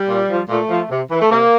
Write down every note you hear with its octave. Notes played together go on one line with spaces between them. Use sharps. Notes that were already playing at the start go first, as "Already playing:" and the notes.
Already playing: G3
A#2
F3
A#2 A3
F3
C3
E3
A3
C3 A#3